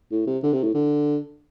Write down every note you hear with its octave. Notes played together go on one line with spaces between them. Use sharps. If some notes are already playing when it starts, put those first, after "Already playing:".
A2
C3
D3
C3
A2
D3